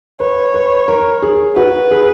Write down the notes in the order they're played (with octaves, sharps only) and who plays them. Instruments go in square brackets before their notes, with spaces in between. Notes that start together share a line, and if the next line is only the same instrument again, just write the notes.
[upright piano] B4 [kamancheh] C#5
[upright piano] B4
A#4
G#4
[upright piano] F#4 [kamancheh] B4
[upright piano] G#4